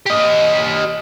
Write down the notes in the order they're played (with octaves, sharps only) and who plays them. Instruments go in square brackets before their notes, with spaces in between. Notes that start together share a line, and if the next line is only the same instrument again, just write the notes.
[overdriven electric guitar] G4 D#5